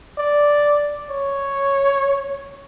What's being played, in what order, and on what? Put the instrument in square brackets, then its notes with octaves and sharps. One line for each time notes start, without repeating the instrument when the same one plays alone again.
[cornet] D5
C#5